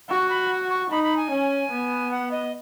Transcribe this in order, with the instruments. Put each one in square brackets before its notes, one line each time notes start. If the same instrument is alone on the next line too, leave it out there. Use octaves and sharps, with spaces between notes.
[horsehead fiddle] F#4 [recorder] C#6
[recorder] B5
C#6
[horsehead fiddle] D#4 [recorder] B5
[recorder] B5
G#5
[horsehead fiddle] C#4
B3
[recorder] F#5
D#5